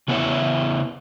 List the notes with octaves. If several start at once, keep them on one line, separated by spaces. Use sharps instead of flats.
C#3 B3 D4 E4 C#5 E5